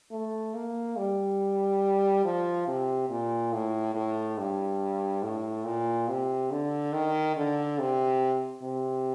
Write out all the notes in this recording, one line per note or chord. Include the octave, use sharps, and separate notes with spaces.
A3
A#3
G3
F3
C3
A#2
A2
A2
G2
A2
A#2
C3
D3
D#3
D3
C3
C3